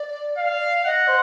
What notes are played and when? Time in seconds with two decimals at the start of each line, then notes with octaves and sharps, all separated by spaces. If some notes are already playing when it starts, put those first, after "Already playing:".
Already playing: D5
0.38 F5
0.84 D#5 F#5
1.07 C5